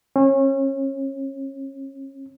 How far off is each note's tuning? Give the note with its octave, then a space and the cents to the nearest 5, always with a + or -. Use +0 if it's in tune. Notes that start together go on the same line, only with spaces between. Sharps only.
C#4 -30